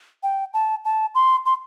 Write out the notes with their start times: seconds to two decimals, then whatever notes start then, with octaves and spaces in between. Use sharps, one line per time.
0.23 G5
0.54 A5
0.85 A5
1.15 C6
1.46 C6